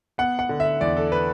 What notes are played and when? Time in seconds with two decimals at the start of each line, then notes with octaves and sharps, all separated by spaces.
0.18 B3 F#5
0.39 F#5
0.49 D3
0.60 E5
0.81 E2 D5
0.97 A4
1.12 B4